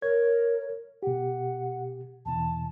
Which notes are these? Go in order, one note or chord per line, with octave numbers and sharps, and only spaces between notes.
A#4 C#5 G#6
B2 G4 F#5
E2 B2 E3 A5